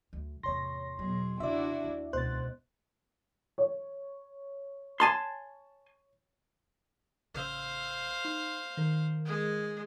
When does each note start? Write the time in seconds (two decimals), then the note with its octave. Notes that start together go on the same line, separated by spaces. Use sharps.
0.13 D2
0.43 E2 A2 C3 C#5 C6 A#6
0.99 B2 F#3 G#4
1.40 C#3 D4 E4 F#4 D5 E5
1.84 D#2
2.13 C#2 B2 C5 F#6 A6
3.58 C#5
5.00 G#5 A5 C6
7.34 A1 C#3 C5 F5 E6
8.25 D#4 C6
8.77 D#3 A#4
9.25 G#3 G#4